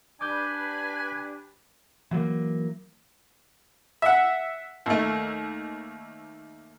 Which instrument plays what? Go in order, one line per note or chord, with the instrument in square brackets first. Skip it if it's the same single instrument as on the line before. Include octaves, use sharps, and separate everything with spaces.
[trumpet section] D4 G4 [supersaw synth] B4 B5 [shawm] G#5 [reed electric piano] D6 G6
[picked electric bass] E3 F#3 G#3 A#3
[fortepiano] E5 F#5
D#2 A3